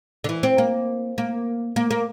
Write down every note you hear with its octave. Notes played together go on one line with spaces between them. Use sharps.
D3
E3
C4
A#3
A#3
A#3
A#3